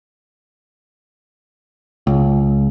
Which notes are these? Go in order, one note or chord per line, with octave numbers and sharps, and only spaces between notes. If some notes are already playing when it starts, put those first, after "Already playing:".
C#2